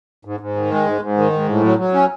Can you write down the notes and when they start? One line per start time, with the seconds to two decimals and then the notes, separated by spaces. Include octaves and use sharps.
0.25 G#2
0.40 G#2
0.56 D#3
0.71 G#3
0.86 G#2
1.02 G#2
1.17 D#3
1.32 G#2
1.48 A2
1.63 F#3
1.79 F#3
1.94 C#4